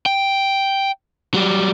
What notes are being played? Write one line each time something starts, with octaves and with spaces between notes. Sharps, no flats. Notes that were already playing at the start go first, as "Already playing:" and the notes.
G5
F#3 G3